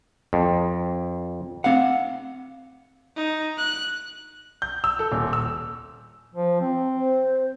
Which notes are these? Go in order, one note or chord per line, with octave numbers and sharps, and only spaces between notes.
F2
C4 F5 F#5
D#4
F#6
G6
E6
A4
D#1
E6
F3
C4
C5